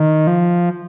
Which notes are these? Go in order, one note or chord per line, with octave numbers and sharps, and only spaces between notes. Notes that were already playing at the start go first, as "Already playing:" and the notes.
Already playing: D#3
F3